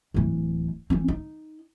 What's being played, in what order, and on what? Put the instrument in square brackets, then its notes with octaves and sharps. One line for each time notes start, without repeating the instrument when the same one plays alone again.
[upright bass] D1 E3
E3 C4
D#4